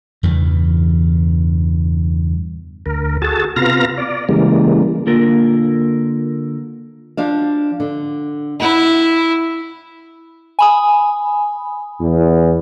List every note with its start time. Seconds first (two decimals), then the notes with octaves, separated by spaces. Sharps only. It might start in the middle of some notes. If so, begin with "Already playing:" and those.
0.23 E2 G2 C#3 E3
2.86 D2 A#4
3.22 F#4 G#4 A4 A5
3.56 C3 B3 F4 F5 A#5 A#6
3.98 D5
4.29 C#3 E3 G3 G#3 A#3
5.07 D3 A#3 F4 A#4
7.17 F3 D4 F5
7.80 D3
8.60 E4 E5 F#5
10.59 G#5 B5 D#6
12.01 E2